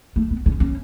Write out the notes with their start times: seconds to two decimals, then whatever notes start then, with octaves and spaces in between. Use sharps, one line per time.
0.16 A3
0.31 B3
0.46 C#4
0.60 C#4